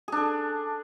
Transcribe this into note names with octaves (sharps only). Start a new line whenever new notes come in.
D4 G#4 A4